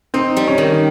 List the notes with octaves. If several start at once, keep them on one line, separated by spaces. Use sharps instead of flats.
C4 D#4
G3
C#4
D#3